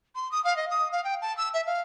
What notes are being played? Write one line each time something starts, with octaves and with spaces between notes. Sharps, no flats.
C6
D#6
F5
D#5
D#6
F5
G5
A5
E6
E5
F5